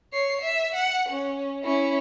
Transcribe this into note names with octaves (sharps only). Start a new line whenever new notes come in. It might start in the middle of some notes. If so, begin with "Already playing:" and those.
C#5 C7
E5
F#5
C#4
C#4 E4